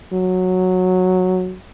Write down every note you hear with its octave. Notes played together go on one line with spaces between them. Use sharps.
F#3